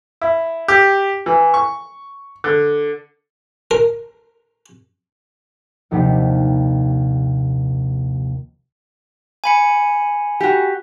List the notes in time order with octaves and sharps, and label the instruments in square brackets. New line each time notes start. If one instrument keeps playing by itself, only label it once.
[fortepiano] E4
G4
E3
C#6
D3
[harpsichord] A#4
[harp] A#1 D#2 C3 G4 F#5 B6
[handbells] G#5 B5 C#7
[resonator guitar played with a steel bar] F#4 G4